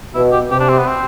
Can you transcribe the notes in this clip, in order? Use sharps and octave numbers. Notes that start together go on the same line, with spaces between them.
B2 E4
G4
C3 G4
D4
C4
B3
C4